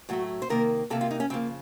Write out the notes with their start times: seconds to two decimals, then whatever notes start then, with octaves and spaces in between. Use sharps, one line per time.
0.09 A2 F#3 A3 F#4
0.42 C5
0.50 C3 D#3 A#3 A#4
0.90 C3 D#3 A#3 A4
1.01 F4
1.11 D#4
1.20 C#4
1.30 C#3 F3 A#3 C4